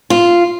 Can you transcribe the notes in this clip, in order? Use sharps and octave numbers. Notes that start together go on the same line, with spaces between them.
F4